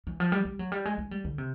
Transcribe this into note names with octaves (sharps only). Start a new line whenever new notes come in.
E3
F3
G3
G3
F#3
G3
G#3
G#3
G3
D3
C3